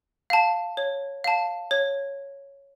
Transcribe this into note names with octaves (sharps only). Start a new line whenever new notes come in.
F5 A5
C#5
F5 A5
C#5